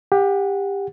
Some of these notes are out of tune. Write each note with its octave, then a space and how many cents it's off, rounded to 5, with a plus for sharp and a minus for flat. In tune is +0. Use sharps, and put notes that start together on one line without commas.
G4 +20 F#5 -10